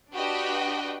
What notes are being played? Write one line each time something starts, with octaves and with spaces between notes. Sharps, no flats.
D4 F#4 G4 B4 D#5 G5